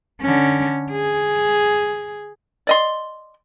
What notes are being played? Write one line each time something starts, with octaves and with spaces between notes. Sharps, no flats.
D3 C#4
G#4
D5 D#5 C6